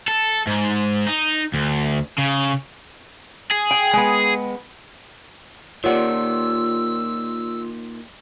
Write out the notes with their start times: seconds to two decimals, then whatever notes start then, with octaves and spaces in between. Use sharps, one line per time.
0.08 A4
0.47 G#2
1.07 D#4
1.54 D2
2.18 C#3
3.51 G#4
3.71 G5
3.93 G#3 B3
5.84 A#2 D#3 F4 G4 C#5 D5 F#5 E6